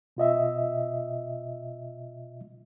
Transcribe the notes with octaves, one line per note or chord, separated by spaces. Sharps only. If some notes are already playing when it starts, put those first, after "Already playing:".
B2 F4 D#5 E5